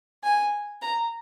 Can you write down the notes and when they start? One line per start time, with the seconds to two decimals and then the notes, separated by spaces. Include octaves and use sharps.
0.23 G#5
0.82 A#5